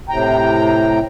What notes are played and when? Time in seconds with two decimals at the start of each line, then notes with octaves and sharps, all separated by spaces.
0.09 A2 C3 G5 A#5